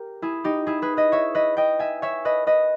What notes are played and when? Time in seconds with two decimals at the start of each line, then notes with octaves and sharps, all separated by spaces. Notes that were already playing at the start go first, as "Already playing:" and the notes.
Already playing: G4 A#4
0.22 E4 G#4
0.44 D#4 G4
0.67 E4 G#4
0.82 G#4 B4
0.97 B4 D#5
1.12 C#5 E5
1.35 B4 D#5
1.57 D#5 G5
1.79 E5 G#5
2.02 C#5 E5
2.25 B4 D#5
2.47 B4 D#5